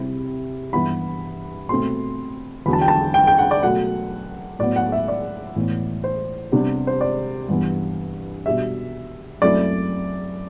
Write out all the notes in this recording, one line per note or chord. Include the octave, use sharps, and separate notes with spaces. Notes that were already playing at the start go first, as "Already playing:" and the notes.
Already playing: C3 G3 C4 E4
G2 E3 G3 B3 E4 B5
B2 A3 C4 C6
E2 D3 F#3 B5
A5
G5
A5
G5
G5
F#5
D5
B2 F#3 A3 F#5
A2 F#3 B3 D5
F#5
E5
D5
A2 E3 B3
C5
C3 G3 B3 D4
C5
D5
G2 E3 B3
B2 G3 D4 E5
F#2 F#3 A3 C4 E4 D5